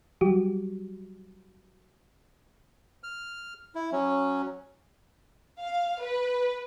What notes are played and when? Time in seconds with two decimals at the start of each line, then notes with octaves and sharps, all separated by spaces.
0.21 F#3 G3 F#4 G4
3.03 F6
3.75 E4
3.92 F#3 C#4
5.61 F5
6.03 B4